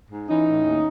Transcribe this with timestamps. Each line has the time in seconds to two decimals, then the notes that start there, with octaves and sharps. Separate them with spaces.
0.10 G#2
0.29 E3 C#4 D#4
0.46 A2
0.65 D#2